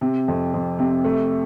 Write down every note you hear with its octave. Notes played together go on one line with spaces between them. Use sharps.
C3
F2
F2
C3
A3